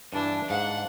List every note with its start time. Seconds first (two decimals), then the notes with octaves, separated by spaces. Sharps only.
0.13 G2 E3 D4
0.50 G#2 F5 F#5